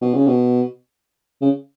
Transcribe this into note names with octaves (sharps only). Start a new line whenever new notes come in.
B2
C#3
B2
C#3